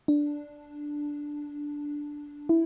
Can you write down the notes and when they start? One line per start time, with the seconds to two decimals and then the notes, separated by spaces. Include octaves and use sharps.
0.08 D4
2.49 E4